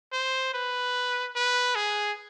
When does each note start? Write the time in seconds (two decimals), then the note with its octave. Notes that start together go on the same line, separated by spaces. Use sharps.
0.13 C5
0.54 B4
1.36 B4
1.75 G#4